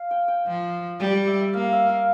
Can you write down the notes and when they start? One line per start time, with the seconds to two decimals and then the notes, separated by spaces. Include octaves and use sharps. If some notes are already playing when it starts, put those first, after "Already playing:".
Already playing: F5
0.11 G5
0.28 G5
0.47 F3
1.00 G3
1.13 D5
1.27 E5
1.41 E5
1.54 A#3 F5
1.64 F5
1.72 E5
1.89 F5